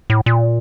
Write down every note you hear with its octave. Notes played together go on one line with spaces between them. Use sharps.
A2
A#2